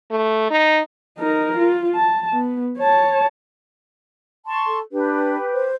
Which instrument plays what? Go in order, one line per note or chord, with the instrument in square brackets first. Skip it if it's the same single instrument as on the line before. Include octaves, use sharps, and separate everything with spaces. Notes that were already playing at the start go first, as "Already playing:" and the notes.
[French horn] A3
D#4
[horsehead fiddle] D#4 A#4
F4
A5
B3
C#5 A5
[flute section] A5 C6 C#6
[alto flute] A4
[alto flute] D4 [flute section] G4 B4
[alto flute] C5